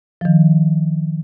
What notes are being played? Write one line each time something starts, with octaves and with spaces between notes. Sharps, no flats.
D#3 F3